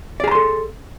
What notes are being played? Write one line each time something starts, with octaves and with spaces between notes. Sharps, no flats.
G#4 A4 D5 A#5 C6